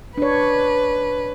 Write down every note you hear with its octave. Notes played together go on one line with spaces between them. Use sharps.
D4 B4 C#5